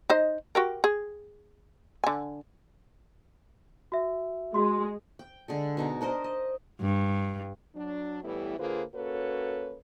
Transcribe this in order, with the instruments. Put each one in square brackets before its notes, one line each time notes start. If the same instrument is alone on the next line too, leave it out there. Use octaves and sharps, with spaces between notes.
[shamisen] D#4 C5 D#5
F#4 G4 A#4
G#4
D3 G#5
[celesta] F#4 E5
[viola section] G#3 [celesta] F#4 C6
[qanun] G5
D3 G#3 A4
B2 D#4 A#5
D4 A#4 C5 D#5
D#5
[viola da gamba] G2
[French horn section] F#3 D4
A2 E3 G3 B3 E4 G4
D3 A#3 F4 G#4 B4 C5
A#3 C#4 F#4 A4 B4 C#5